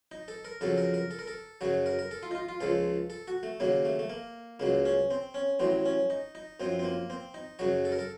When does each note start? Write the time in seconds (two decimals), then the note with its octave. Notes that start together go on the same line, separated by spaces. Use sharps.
0.12 D#4
0.28 A4
0.45 A#4
0.61 F2 C#3 F#3 A4
0.77 A#4
0.94 A#4
1.11 A4
1.19 A#4
1.27 A4
1.61 F#2 C#3 F#3 F#4
1.86 A#4
1.99 A#4
2.11 A4
2.23 F4
2.31 D#4
2.35 F4
2.49 F4
2.61 C#2 C#3 F3 A4
3.10 A4
3.28 F#4
3.43 A3
3.60 D#2 C#3 F#3 A#3
3.85 A3
3.99 A3
4.10 A#3
4.60 C#2 C#3 F#3 A#3
4.85 C#4
5.11 C4
5.34 C#4
5.60 A1 A2 F#3 C4
5.85 C#4
6.10 D#4
6.35 D#4
6.60 F#2 F3 C4
6.79 C4
6.84 A#3
7.10 C4
7.34 D#4
7.59 F#2 C#3 F#3 F#4
7.85 A4
7.92 A#4
7.99 A4